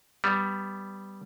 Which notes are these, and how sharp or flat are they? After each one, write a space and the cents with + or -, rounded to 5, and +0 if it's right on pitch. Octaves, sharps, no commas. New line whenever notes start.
G3 -5 B3 +10